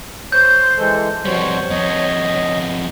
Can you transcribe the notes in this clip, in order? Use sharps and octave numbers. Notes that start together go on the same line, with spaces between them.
C5 C#5 G6
E3 G#3 A4
F2 B2 G3 F#4 C5 C#5
F2 B3 D#5